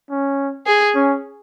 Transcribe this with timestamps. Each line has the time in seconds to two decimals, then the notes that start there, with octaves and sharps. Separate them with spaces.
0.10 C#4
0.67 G#4
0.95 C#4